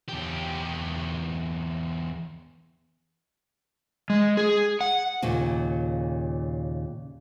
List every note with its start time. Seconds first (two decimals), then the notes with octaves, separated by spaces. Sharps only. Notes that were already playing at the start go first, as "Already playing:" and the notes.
0.08 E2 G4
4.10 G#3
4.37 G#4
4.81 F#5
5.22 D#2 A#2 C#3